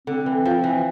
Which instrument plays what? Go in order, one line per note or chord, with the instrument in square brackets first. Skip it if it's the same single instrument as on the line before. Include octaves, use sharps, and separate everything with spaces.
[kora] D3 [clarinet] C4
[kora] E3
F3
E3